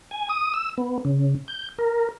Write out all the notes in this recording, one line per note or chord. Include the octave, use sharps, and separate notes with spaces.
G#5
D#6
E6
B3
C#3
G6
A#4